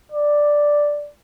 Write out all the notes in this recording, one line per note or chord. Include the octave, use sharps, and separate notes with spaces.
D5